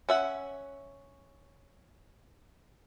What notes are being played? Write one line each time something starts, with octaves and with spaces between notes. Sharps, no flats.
C#4 E5 F#5